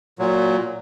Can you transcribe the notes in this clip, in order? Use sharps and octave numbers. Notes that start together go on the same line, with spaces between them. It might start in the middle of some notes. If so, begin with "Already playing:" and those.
A#2 F#3